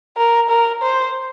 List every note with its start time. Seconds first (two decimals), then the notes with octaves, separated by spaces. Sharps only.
0.17 A#4
0.49 A#4
0.82 C5